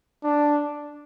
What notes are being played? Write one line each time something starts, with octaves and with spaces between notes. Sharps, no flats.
D4